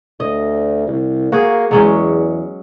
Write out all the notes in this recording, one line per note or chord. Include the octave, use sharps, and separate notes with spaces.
D2 D#5
C2
A#3 F#4 G#4
E2 F#3 G#3 C#4